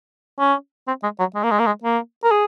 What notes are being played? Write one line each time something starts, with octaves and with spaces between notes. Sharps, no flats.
C#4
C4
G#3
F#3
G#3
A#3
G#3
A#3
G#3
A#3
A#4
G#4